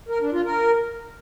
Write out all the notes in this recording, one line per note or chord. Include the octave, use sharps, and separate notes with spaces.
A#4
D4
F4
A#4